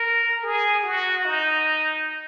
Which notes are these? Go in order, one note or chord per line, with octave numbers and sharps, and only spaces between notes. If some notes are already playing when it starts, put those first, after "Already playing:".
Already playing: A#4
G#4
F#4
D#4